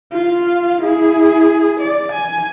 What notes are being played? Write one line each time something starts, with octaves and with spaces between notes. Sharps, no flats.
F4 F5
E4 G#4
D5
G#5